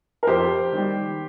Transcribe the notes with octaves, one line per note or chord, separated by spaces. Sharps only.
A#4
F2 G4 C5
D#3 G3